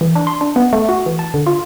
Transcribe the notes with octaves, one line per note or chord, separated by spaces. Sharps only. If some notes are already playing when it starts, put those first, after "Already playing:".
E3
D4
C6
D4
B3
A3
F#4
E3
A5
D3
F4